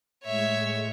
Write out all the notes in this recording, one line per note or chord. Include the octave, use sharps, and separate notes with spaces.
A2 G#3 C#5 E5